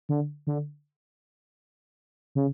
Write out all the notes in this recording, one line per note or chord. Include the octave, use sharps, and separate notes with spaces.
D3
D3
C#3